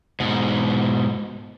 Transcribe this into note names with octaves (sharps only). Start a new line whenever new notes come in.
G#2 B2